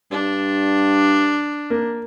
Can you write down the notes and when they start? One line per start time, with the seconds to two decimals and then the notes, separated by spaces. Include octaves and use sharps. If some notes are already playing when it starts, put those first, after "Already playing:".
0.11 G2 D4
1.70 A#3